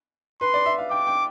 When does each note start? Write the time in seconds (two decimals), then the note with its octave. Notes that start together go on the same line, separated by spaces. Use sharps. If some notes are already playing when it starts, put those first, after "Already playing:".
0.41 B4 C6
0.54 D5
0.66 E5
0.78 F5
0.91 G5 D6
1.07 G5